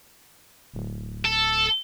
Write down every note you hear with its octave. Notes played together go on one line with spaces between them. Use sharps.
D1
A4